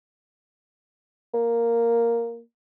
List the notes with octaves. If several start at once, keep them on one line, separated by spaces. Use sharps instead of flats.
A#3